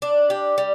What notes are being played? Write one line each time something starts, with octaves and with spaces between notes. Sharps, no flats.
D4
G4
G3